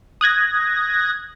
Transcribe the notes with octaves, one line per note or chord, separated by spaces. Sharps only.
D#6 F#6 G#6 A#6